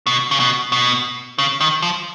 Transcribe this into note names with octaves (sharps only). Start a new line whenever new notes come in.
B2
C#3
B2
B2
C#3
D#3
F3